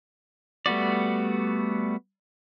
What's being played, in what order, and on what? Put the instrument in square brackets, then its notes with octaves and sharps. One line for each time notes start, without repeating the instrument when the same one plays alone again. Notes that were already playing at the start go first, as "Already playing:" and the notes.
[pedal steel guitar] G3 A3 B3 F#4 D5